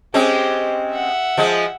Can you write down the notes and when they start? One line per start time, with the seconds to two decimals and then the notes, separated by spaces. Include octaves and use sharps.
0.14 G#3 C4 C#4 G4
0.90 E5 F#5
1.38 F3 G#3